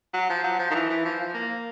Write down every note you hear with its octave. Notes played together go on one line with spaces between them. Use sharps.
F#3
F3
F#3
F3
D#3
E3
E3
F3
F3
A#3